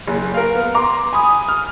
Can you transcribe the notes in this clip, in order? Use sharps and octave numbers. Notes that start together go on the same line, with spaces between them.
F#1
A#4 F5
B3
A#5 C6 D6
G#5 B5 D#6
F6